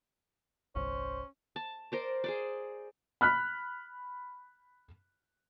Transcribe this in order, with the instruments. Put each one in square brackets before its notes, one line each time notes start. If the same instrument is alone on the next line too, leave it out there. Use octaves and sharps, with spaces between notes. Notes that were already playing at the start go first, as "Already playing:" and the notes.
[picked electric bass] G1 C2 [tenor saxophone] C#4 [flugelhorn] C5
[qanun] A5
A#4 C5 D5
G#4 C5 D5
[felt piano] B5 F6 F#6 B6